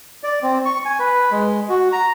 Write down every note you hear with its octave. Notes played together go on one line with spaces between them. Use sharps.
D5
C4
C#6
G#5
B4
G#3
F#4
A#5